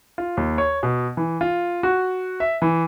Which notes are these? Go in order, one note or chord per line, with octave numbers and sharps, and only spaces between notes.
F4
D#2
C#5
B2
E3
F4
F#4
E5
E3